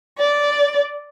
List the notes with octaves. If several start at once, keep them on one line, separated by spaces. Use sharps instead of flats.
D5